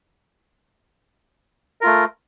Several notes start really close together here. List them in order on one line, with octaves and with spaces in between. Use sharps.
A#4 F4 A3